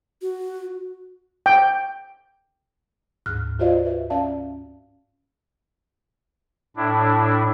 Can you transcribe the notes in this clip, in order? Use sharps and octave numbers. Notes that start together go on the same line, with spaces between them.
F#4
G5
D2 G#2 F6 F#6
F4 F#4 C5 D5 D#5 F5
B4 E5
C#4 D5 E5 F5 A5
A2 D4 E4